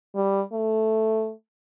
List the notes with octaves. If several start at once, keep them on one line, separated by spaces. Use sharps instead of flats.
G3
A3